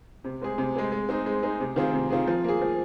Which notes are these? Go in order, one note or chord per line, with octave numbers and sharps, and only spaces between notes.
C3
G#3 C4 G#4
C3
G#3 C4 G#4
G#3
C4 D#4 G#4
G#3
C4 D#4 G#4
C3
D#3 C4 F4 G#4
C3
D#3 C4 F4 G#4
F3
A#3 G#4
F3